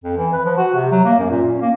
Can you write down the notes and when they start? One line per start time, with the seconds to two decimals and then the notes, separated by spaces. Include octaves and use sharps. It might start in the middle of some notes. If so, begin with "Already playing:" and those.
0.04 F2
0.17 E3
0.33 B4
0.45 F3
0.58 F#4
0.75 C3
0.91 F#3
1.05 A#3
1.19 F#2
1.30 A#2
1.47 C#4
1.61 A#3